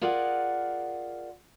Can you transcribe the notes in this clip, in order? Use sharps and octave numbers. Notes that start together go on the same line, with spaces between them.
F4 G#4 A#4 D5 F#5